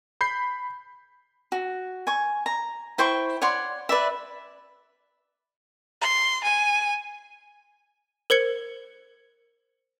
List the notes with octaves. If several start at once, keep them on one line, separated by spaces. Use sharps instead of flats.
B5 G6 C7
F#4
G#5 C#6
A#5
E4 C5 G5 C#6
C#5 D5 F#5 C6
B4 D5 E5
C6
G#5
A#4 C5 G#6 C#7